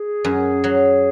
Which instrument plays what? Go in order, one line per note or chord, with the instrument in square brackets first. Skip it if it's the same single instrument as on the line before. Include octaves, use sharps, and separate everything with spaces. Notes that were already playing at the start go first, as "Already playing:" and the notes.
Already playing: [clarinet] G#4
[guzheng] F#2
F#3